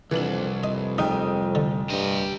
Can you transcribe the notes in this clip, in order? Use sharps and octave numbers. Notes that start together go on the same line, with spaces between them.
C2 F2 E3 D4 F#7
F2 D#5
F1 A#1 D#4 G5 D#6
D3
G2 G4 D#5